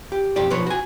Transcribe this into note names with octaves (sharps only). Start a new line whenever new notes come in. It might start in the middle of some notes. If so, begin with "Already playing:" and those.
G4
F2 B2 G4 D5
B1 F3 B4 C#5
F#4 G#5